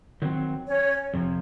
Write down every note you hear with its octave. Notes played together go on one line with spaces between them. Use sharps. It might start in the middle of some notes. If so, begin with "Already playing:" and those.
D#3 F#3 C4
C#4 C#5
F2 C3 F3